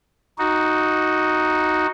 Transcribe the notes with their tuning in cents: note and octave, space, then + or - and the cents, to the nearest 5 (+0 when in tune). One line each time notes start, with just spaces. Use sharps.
D#4 +0 F#4 +0